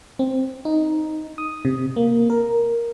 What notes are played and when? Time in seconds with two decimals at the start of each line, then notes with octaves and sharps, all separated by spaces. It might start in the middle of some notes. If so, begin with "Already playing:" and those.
0.19 C4
0.65 D#4
1.38 D#6
1.65 C3
1.96 A#3
2.30 A#4